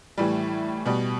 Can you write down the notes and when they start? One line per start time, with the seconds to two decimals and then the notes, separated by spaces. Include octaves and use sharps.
0.18 A2 E3 G3
0.86 B2 G3